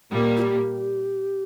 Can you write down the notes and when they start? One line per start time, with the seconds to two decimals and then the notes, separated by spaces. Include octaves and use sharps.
0.11 A#2 G3 A#3
0.37 F4
0.42 G4